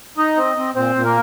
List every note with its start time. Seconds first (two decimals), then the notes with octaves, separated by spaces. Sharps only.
0.17 D#4 D#5
0.36 C4
0.57 C4
0.75 A#2 C4 C5
0.95 A#2
1.04 A#3 A#4